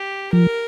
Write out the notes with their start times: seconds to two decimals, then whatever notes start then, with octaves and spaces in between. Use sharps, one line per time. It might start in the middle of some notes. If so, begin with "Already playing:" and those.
Already playing: G4
0.33 F3 A#4